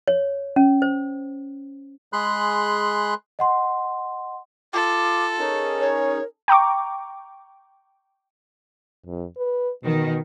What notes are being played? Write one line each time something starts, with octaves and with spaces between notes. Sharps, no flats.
C#5
C#4
C5
G#3 G#4 B5 C6 F#6
D#5 F#5 C6
F4 A4 D6
C#4 D#4 G#4 A#4
C#5
G5 A#5 C#6 D6
F2
B4
B2 D#3